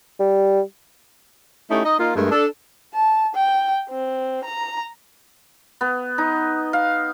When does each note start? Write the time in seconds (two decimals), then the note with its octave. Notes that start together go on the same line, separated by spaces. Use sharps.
0.19 G3
1.70 A3 C#4 D#4 E4 G4
1.84 D#4 D#5
1.98 A#3 D#4 F4
2.16 G2 G#3 A3 G#4 A#4
2.31 D4 A4
2.94 A5
3.35 G5
3.90 C4
4.44 A#5
5.81 B3
6.18 D#4
6.73 F5